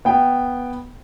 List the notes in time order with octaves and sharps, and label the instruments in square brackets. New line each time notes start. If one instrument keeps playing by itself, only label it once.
[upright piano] B3 G5